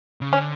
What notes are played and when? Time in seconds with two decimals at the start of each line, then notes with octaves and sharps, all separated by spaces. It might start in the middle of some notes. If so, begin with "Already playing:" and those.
0.21 C#3
0.32 D3 C#4